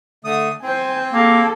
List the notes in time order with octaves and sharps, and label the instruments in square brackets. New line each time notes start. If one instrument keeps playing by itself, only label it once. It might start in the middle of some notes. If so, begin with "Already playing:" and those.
[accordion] D3 A3 D#6
[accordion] C4 [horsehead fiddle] C5 G#5
[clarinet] A#3 [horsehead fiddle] G#4 A4